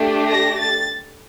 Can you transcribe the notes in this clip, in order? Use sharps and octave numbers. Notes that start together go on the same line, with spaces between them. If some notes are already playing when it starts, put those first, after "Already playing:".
Already playing: A3 D4 G4
A#6
A6